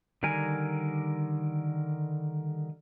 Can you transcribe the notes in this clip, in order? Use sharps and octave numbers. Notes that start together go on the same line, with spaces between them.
D3 D#3 G3 A#4 G#5